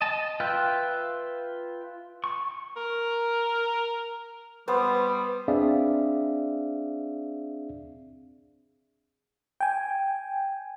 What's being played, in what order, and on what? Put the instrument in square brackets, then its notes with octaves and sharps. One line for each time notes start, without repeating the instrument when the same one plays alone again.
[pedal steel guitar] D#5 A5
F4 B4 E5 F5 G5
C#6
[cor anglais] A#4
[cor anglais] G3 [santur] B3 C5
[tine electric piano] C4 D4 G#4 D5 E5 F5
[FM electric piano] G5 G#5